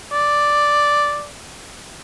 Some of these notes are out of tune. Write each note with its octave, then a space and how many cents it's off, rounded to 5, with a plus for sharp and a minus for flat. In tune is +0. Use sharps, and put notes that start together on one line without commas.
D5 +0